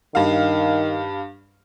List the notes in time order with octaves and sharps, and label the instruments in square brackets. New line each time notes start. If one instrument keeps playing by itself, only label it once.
[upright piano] G2 F5 [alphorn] D#3